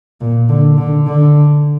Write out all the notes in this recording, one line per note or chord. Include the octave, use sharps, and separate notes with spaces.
A#2
D3
D3
D3